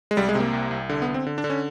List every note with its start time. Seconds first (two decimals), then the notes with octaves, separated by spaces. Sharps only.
0.11 G#3
0.17 C2 G3
0.29 G#3
0.35 C3
0.40 A#3
0.53 C2
0.71 C2
0.90 D3
1.02 B3
1.07 D3
1.14 C4
1.26 D3
1.38 D4
1.44 D3
1.50 C#4